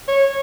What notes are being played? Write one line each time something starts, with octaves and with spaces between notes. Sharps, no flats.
C#5